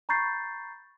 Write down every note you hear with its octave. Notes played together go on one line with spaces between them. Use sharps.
A#5 B5 C#6 G6 A6 C7